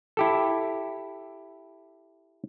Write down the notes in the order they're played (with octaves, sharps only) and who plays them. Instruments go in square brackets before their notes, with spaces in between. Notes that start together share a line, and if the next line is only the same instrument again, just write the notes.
[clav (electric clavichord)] E4 G4 A4